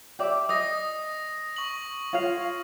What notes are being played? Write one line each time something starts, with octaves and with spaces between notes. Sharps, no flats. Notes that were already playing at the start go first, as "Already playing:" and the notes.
G4 D5 E5
D#5 D#6 A#6
C#6 F#7
F4 C#5 F5